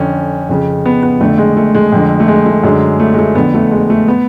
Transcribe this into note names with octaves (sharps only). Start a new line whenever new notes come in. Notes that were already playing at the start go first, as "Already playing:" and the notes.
Already playing: F2 D3 C#4
F2 C#3
B3
B3
F2 D3 A3
G#3
A3
G#3
F2 D3
A3
G#3
A3
F#2 D3 G#3
A3
G#3
A3
F2 D3 B3
A3
G#3
A3
B3